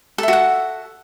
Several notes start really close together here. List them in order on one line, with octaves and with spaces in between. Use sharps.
A4 E5 F#4 F#5